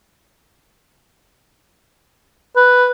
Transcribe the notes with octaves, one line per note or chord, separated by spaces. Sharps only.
B4